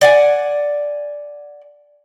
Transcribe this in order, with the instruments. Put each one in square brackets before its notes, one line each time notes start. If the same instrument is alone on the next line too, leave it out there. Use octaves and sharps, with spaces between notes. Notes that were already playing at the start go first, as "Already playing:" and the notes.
[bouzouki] D5 F#5 G#5